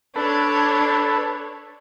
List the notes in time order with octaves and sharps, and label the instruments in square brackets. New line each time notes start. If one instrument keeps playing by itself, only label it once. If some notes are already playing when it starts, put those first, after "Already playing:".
[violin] D4 C#5 [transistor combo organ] A4 B4